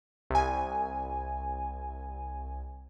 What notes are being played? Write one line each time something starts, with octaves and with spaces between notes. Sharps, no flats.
C2 G#5